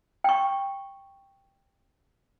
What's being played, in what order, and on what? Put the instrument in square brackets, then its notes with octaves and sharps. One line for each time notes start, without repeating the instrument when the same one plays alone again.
[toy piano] G5 C#6